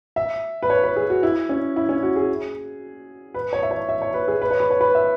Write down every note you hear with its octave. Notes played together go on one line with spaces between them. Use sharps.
E5
B4
C#5
B4
G#4
F#4
E4
C#4
E4
C#4
F#4
G#4
B4
C#5
E5
C#5
E5
C#5
B4
G#4
B4
C#5
B4
C#5
B4
E5